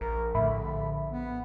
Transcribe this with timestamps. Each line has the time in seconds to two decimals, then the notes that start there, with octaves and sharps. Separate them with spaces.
0.01 A#1 A#4
0.35 A#1 A2 D3 E5 B5
1.10 B3